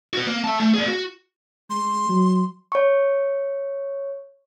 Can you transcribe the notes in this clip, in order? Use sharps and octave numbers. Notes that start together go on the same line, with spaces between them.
F#4 B4
A#3
E5 A5
A3
A#3 G#4
F#4
G#3 C6
F#3
C#5 C#6